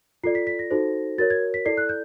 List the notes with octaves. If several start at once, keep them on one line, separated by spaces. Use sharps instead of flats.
F4 A4 D5 C7
B6
B6
A#6
D#4 F#4 A4 C5
F#4 A#4 C#5 A6
G#6
B6
E4 A4 D5 C7
F#6
G6